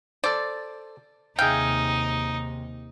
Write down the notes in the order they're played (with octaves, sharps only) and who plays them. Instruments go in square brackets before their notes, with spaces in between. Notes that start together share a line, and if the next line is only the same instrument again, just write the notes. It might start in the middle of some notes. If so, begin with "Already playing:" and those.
[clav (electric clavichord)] A4 C5 [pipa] D5
[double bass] D#2 C3 [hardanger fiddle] D#4 [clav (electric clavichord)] G#4 E5 F5 [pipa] G5